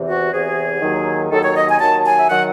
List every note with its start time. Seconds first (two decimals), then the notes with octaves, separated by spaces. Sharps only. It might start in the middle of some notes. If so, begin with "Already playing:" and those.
Already playing: E2 C3 E3
0.09 F#4
0.33 E2 C3 E3 G#4
0.82 D#2 D#3 F#3
1.31 D#2 D#3 F#3 A4
1.44 C#5
1.55 D#5
1.68 G#5
1.80 D#2 D#3 F#3 A5
1.99 A5
2.05 G#5
2.18 E5
2.29 D#3 F#3 F#5